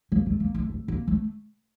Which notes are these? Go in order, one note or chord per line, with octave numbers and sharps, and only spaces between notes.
A#3
A3
A#3
A3
A3
A#3
A3